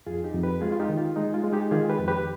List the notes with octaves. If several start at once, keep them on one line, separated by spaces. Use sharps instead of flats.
F2 F4 G#4
D#4 G4
F2
G4 B4
G#3 F4 G#4
F4
D#4 G4
D#3
F4
G#3 D#4
F4
G#3
D#4 G4
D#3 F4 G#4
G4 B4
F2
G4 B4